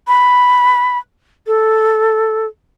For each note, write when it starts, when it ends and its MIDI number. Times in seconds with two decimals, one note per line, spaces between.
0.08 0.98 83
1.47 2.46 69